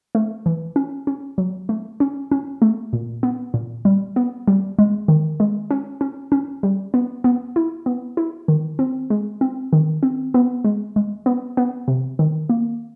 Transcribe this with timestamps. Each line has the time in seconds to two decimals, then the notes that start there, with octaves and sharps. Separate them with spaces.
0.15 A3
0.46 E3
0.76 C#4
1.07 C#4
1.38 F#3
1.69 A3
2.00 C#4
2.31 C#4
2.62 A3
2.93 A#2
3.23 B3
3.54 A#2
3.85 G3
4.16 B3
4.48 G3
4.79 G#3
5.08 D#3
5.40 G#3
5.71 C#4
6.01 C#4
6.32 C#4
6.63 G3
6.94 B3
7.24 B3
7.56 E4
7.86 B3
8.17 E4
8.48 D#3
8.79 C4
9.10 G#3
9.41 C4
9.73 D#3
10.03 C4
10.34 B3
10.64 G#3
10.96 G#3
11.26 B3
11.57 B3
11.88 C3
12.19 D#3
12.49 A#3